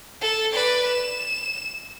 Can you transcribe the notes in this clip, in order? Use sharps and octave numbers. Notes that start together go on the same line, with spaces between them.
A4
B4 D5
E7